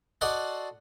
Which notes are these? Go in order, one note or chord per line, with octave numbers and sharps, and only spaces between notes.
F#4 A4 C5 D5 D#5 F#5